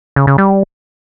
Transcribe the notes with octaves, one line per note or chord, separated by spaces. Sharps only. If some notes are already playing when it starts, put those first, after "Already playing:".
C#3
C#3
G3